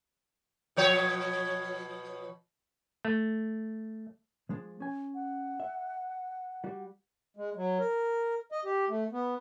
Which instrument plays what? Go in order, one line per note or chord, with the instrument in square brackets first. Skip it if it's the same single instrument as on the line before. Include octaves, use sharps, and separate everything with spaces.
[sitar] B2 F3 C#5
[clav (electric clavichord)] A3
[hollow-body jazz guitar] F3 G#3 D4
C#4 G#5
[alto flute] F#5
[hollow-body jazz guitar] E5
G3 F#4
[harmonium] G#3
F#3
A#4
D#5
G4
A3
B3